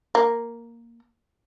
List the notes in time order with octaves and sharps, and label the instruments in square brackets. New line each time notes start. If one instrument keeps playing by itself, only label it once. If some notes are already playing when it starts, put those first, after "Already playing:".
[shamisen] A#3